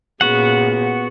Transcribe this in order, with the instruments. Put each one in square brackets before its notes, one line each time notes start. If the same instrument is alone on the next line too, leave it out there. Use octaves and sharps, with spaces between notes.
[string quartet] A#2 C#3 [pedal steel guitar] B3 F#4 F#5